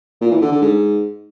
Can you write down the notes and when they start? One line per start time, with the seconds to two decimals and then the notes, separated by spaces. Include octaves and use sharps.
0.21 A#2
0.32 E3
0.42 D3
0.52 D3
0.62 G#2